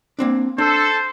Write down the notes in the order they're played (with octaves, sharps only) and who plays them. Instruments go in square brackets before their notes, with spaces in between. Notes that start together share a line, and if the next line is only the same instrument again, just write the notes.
[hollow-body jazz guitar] A#3 C4 D4
[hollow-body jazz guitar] D4 [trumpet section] A4 [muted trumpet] C5